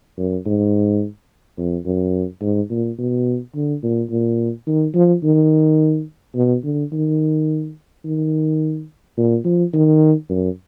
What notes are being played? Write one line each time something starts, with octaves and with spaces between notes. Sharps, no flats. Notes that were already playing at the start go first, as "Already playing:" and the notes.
F#2
G#2
F2
F#2
G#2
A#2
B2
D3
A#2
A#2
D#3
F3
D#3
B2
D3
D#3
D#3
A#2
F3
D#3
F#2